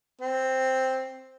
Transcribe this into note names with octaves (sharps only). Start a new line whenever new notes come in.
C4